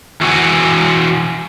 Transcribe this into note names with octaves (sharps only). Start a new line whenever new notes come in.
E3 F#4 D5 F#5 G#5